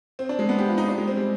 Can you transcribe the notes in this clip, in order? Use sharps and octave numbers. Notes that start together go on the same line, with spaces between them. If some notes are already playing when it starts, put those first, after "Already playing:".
C4
D4
G#3
B3
G4
F4
D#4
D4
G#3
C4
G3